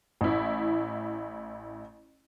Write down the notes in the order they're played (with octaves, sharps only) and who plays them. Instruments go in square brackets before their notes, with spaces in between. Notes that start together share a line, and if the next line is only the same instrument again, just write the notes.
[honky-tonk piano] A1 E4